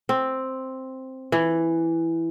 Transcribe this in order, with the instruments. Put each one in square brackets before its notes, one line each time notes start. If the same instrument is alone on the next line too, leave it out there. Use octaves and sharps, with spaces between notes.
[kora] C4
E3